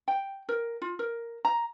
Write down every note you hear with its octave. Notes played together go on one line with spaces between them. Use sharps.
G5
A#4
F4
A#4
A#5